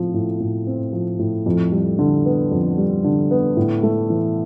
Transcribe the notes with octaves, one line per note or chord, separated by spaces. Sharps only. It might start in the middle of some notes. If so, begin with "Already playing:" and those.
Already playing: A2 F3 C4
A2
A2
C4
F3
A2
F2
G3
D3
B3
F2
G3
D3
B3
A2
A3
E3